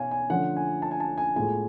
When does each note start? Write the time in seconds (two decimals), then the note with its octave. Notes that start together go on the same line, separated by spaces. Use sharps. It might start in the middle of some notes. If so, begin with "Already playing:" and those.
Already playing: B2 C#5 F5 G#5
0.11 G#5
0.30 D3 F3 A3 C#4 F4 F#5
0.57 G#5
0.82 A5
0.91 G#5
1.00 A5
1.17 G#5
1.36 A2 G#3 B3 F4 G#5